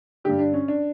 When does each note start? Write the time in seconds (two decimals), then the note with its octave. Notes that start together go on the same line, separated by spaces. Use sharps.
0.24 G2 D3 G4
0.39 D4
0.53 C#4
0.68 D4